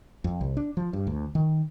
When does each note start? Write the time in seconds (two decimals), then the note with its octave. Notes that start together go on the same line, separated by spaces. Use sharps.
0.24 F2
0.41 C2
0.57 D4
0.77 F3
0.93 G2
1.07 D2
1.35 D#3